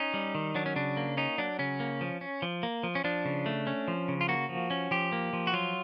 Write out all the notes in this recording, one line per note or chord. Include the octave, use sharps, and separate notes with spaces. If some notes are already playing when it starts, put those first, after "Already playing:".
Already playing: C#4 D#4
G3
D#3
F#3 D4
C#4
C#3 D4
A#3
C#4 D#4
F#3 D4
C#3 C#4
A#3
F3
C#4
F3
A#3
F3
C#4
F3 D4
C#3
A3
C#4
F3
C#3
F4
A#3 F#4
F3
C#4
F3 G4
A#3
F3
F#4
F#3 F4